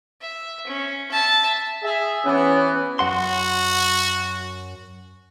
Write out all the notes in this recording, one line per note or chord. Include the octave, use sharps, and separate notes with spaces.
E5
C#4
E5 A5
G#4 E5
E3 B3 C#4
F#2 F#4 F#5 C6